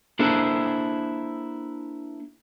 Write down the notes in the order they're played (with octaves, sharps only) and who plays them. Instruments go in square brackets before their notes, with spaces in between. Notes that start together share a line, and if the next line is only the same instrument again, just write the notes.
[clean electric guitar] A#3 D4 E4 G#4 A4 C5